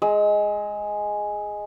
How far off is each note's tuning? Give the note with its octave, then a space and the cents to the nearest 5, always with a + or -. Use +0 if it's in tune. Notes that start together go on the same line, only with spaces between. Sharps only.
G#3 +0 E6 -45